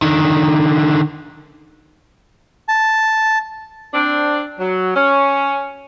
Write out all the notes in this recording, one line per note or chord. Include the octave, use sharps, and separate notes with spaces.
D3 D#3
A5
C4 D4
F#3
C#4